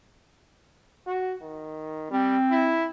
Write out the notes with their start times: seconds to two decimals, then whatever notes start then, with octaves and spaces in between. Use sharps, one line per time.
1.06 F#4
1.41 D#3
2.10 G3 C4
2.51 E4